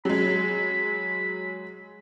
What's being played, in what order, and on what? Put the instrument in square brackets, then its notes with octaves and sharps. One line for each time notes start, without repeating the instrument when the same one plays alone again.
[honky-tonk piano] F#3 G#3 [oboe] B5